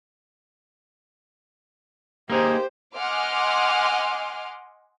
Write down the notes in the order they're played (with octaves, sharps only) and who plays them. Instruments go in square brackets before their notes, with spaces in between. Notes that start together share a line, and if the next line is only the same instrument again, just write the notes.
[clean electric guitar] A#3 D#4 G#4 [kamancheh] G4 C5
[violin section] D#5 F#5 G#5 C6 D6 F6